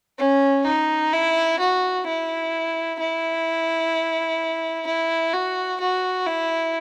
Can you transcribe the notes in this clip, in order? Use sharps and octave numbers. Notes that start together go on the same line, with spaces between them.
C#4
D#4
E4
F#4
E4
E4
E4
F#4
F#4
E4